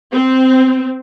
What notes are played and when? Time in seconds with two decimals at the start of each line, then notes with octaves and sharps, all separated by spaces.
0.13 C4